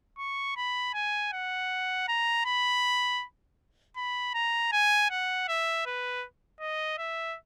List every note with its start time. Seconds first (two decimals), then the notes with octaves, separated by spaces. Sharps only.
0.18 C#6
0.56 B5
0.94 G#5
1.33 F#5
2.08 A#5
2.45 B5
3.96 B5
4.34 A#5
4.72 G#5
5.10 F#5
5.48 E5
5.86 B4
6.60 D#5
6.98 E5